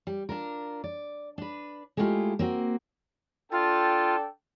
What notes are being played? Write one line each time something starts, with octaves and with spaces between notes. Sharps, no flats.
G3
D4 F4 A#4
D5
D4 B4
G#3 A3 B3 E4 F4 G4
A#3 C4 F#4
D4 F4 A4 G5